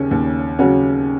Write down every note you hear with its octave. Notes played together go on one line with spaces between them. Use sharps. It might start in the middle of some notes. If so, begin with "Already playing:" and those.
Already playing: D#2 C#3 C#4
D#2
C#3 F#3 C#4 F#4